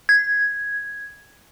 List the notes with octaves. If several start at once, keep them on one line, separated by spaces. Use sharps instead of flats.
G#6